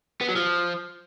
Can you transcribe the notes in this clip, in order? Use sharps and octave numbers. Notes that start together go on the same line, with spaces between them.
B3
F#3
F3